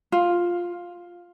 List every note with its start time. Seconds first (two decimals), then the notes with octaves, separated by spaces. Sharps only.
0.12 F4